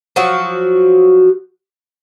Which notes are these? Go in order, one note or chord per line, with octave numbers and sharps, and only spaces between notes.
F3 F#3 F#4